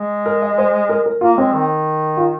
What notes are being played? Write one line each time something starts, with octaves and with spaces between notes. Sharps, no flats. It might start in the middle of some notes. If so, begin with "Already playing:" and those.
Already playing: G#3
A#4
D#5
C5
A#4
A#4
A#3 F4
G#3 C4
D#3
F4